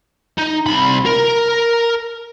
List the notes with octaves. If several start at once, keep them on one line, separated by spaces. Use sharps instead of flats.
D#4
C2 B5
A#4